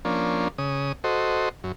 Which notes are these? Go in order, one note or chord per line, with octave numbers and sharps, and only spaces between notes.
F3 A#3 C#4 D4
C#3 D#6
F#4 A4 C5 D#5
F#2